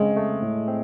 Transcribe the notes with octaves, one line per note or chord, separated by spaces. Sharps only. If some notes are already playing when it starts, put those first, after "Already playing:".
Already playing: C#3 G#3 C4
A3
A2
C4